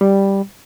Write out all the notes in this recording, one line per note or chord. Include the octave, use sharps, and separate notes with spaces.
G3